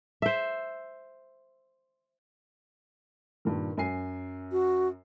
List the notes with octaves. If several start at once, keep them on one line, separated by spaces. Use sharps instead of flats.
C5 E5
G2 A#2 D#3
F#2 G#5 C7
F#4